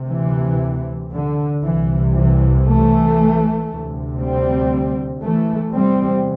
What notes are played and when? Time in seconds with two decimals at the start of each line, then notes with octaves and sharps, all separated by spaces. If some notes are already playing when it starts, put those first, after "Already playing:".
Already playing: D2 C3
0.10 E3
1.12 D3
1.63 C2 C3 E3
2.15 E3
2.66 E3 A3
3.68 D2 C3
4.20 G3 C4
5.22 E3 A3
5.73 E2 C3 G3 C4